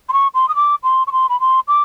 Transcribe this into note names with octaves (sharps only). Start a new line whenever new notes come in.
C6
C#6
C6
D#6
D6
C6
C#6
C6
B5
C6
D6